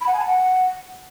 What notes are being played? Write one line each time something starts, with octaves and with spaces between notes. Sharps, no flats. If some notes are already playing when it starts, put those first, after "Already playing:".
B5
F#5
G#5
A5
F#5